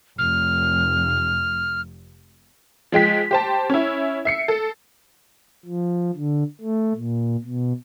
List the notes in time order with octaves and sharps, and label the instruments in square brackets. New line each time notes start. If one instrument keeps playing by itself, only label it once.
[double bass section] F1 [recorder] F6
[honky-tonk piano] F3 G#3 G5 B6
G4 C5 A5
C#4 E4
E5 C7 C#7
A4
[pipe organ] F3
D3
A3
A#2
B2